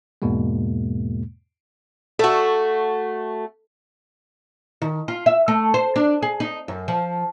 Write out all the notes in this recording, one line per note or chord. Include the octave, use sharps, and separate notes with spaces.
E2 G#2 B2 G#3 A#3
A3 F#4 A4
D#3
F4
E5
A3
C5
D4
G#4
D#4
F#2
F3